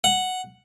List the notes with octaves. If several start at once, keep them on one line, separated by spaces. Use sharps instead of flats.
F#5